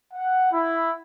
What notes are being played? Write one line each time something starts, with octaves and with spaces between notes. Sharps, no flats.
F#5
E4